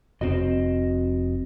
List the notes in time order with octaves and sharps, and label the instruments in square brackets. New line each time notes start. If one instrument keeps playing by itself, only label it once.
[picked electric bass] F1 B2 C4 [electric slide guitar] F#4 D#5